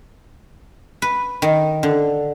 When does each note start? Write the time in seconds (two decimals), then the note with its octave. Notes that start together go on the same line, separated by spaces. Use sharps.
1.02 B4
1.42 D#3
1.83 D3